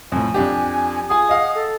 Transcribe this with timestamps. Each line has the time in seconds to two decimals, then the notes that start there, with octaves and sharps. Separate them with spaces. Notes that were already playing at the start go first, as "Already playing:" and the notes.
0.12 F2 A2 G#5
0.34 F2 D4 G4
1.09 F4 G#4 G#5 D#6
1.29 D#5 F5 F#5
1.55 A4